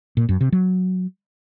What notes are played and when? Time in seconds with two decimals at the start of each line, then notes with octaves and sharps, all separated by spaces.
0.17 A#2
0.29 F#2
0.41 C3
0.52 F#3